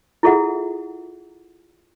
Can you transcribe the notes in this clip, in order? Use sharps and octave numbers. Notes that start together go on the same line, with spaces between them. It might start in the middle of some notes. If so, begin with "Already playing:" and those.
E4 F4 G#4 A4 E5 F#5